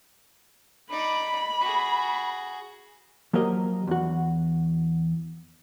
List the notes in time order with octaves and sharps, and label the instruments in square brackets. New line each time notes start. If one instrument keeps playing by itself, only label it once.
[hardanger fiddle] D#4 D5 [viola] B5
[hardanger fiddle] F#4 G#4
[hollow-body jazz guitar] F3 F#3 A#3 G4 A#4 D#5
E2 F#4